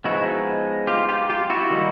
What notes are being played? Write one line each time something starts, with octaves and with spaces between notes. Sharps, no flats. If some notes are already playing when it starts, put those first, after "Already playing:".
F3 G#3 B3 D#4 E4 F#4
F4 G4
F4 G4
F4 G4
E4 F#4
D#3 G3 A#3 D#4